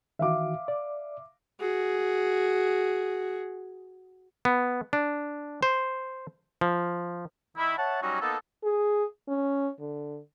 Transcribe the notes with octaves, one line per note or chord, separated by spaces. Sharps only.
D#3 E3 F#4 E5 F5 D6
D5
F#4 G#4
B3
D4
C5
F3
D#3 E4
C#5 E5 F#5 A5
F#3 G3 C#4 D#4 F#4
A#3 B3 D#4 A4
G#4
C#4
D3